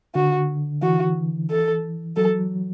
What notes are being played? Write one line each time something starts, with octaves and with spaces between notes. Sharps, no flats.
D3 F#4
E3 F#4
A4
F#3 A4